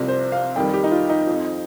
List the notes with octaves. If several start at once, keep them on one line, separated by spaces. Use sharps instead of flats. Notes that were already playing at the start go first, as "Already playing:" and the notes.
Already playing: C2 C3 F3
C5
F5
F2 D#3 G3 G5
G4
D#4
F4
D#4
F2 F3